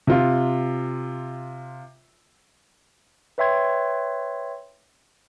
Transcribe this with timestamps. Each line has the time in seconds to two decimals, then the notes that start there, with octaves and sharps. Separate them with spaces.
0.07 C3 F4
3.38 B4 C#5 E5 G5 C6 G#6